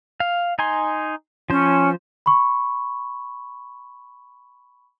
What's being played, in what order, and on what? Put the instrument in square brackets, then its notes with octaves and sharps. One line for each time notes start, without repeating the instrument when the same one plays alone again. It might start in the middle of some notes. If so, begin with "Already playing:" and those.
[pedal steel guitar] F5
D#4 G#5 C6
[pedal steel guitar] F3 C5 [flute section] C#4
[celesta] B5 C#6